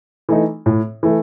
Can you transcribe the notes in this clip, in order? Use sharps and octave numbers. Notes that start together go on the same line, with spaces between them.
E3 A3 D#4
A2
E3 A3